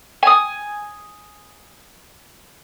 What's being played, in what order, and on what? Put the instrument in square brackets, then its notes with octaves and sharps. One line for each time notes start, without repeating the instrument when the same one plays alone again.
[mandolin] G#5 D#6